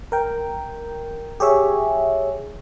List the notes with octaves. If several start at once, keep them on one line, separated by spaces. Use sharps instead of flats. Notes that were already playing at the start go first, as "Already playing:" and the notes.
A#4 G5
G4 G#4 C#5 E5